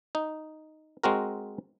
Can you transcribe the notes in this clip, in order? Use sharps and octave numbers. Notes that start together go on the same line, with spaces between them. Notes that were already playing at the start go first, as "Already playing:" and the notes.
D#4
G#3 C4 F#4 A#4